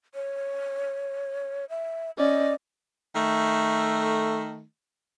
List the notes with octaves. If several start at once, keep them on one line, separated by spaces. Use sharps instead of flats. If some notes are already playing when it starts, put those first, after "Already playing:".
C#5
E5
C#4 D5 D#5
D#3 A3